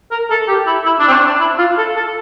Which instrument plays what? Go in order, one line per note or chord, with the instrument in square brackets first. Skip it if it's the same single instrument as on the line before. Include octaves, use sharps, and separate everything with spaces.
[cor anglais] A#4
A4
G4
E4
E4
D4
C4
D4
D4
E4
F4
A4
A4